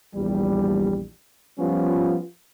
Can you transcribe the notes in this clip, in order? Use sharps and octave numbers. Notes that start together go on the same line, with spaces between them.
A#1 E2 G3
F3 G3 B3 C#4 F4